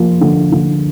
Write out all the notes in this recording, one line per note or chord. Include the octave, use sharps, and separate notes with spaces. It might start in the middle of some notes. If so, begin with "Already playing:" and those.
Already playing: F3 A#3
D3
D3